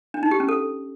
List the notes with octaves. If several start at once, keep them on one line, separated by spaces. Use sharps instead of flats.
D4
D#4
G4
C#4
A4